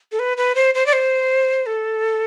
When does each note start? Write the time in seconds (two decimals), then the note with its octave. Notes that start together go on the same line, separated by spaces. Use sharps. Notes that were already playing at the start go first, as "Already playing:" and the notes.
0.12 A4
0.19 B4
0.37 B4
0.55 C5
0.74 C5
0.86 D5
0.93 C5
1.66 A4